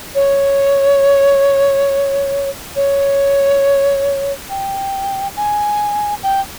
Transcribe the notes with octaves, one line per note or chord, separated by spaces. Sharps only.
C#5
C#5
G5
G#5
G5